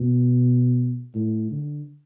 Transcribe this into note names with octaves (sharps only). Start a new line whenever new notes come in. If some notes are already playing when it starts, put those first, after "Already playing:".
Already playing: B2
A2
D3